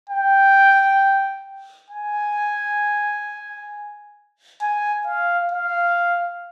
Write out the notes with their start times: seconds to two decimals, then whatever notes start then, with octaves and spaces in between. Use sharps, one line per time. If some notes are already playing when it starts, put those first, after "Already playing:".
0.10 G5
1.91 G#5
4.62 G#5
5.07 F5
5.52 F5